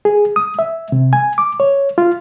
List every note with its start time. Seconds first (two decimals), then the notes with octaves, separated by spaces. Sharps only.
0.05 G#4
0.36 D#6
0.59 E5
0.92 C3
1.13 G#5
1.38 D6
1.60 C#5
1.98 F4